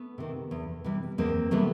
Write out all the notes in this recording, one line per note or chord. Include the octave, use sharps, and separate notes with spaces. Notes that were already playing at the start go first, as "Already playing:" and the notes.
Already playing: A3 B3
C3 D#3
E2
C3 E3 G3
E2 A#3 C4
C3 E3 G3 A3 B3